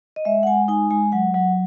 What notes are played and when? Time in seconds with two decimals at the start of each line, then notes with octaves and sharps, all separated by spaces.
0.16 D#5
0.25 G#3 E5
0.43 F#5
0.47 G#3 G#5
0.68 D#4 G#5
0.91 G#3 G#5
1.12 F#3 F#5
1.34 F#3 F#5